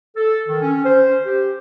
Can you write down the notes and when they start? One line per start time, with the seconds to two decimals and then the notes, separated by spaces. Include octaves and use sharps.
0.17 A4
0.48 D#3
0.62 C#4
0.85 C5
1.26 G4